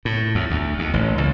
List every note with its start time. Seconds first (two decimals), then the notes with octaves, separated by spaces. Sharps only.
0.05 A2
0.35 E2
0.51 D2
0.79 D#2
0.94 A1
1.18 C#2